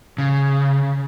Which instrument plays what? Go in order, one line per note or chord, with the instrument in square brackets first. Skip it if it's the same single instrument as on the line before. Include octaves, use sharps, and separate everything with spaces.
[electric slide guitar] C#3